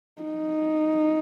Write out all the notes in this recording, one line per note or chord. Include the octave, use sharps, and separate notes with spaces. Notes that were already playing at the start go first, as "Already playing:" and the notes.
D#4